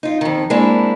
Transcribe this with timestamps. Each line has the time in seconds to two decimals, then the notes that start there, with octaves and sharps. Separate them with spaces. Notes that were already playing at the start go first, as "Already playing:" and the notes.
0.03 D#4 F4
0.21 F2 D#3
0.50 G#3 A#3 C4 D4 E4